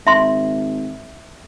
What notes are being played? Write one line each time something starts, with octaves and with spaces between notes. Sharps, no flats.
G#1 E5 C6